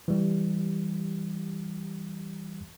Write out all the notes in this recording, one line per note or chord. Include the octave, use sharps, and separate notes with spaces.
E3 G3 G4